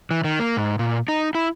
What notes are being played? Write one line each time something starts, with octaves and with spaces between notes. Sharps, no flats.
E3
D#3
A#3
G#2
A#2
D#4
E4